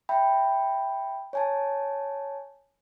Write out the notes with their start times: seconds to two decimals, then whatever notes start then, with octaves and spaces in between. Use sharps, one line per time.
0.09 E5 G5 B5
1.33 C#5 G#5 A5